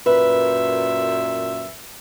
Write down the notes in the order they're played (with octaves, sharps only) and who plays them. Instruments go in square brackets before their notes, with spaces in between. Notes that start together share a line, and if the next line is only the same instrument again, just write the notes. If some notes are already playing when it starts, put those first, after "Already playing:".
[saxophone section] F#2 A#2 E5 [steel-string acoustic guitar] B4